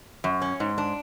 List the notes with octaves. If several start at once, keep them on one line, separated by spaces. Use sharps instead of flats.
F#2
C#4
G#2
D4